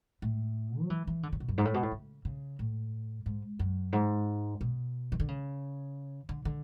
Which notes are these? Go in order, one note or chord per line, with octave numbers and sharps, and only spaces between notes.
A2
F#3
E3
E3
D3
C#3
B2
F#2
G#2
A2
B2
A2
C#3
C#3
A2
G#2
F#2
G#2
B2
E3
D3
C#3
D3
D3